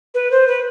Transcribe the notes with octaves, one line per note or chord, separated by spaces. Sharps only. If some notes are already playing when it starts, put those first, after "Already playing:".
B4
C5
B4